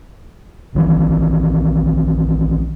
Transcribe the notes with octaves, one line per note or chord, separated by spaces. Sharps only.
A#1 D#3 E3